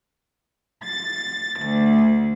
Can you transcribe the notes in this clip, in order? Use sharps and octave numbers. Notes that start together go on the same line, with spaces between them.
A6
D2